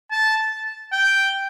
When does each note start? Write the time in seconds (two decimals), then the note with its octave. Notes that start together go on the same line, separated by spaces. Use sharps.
0.11 A5
0.92 G5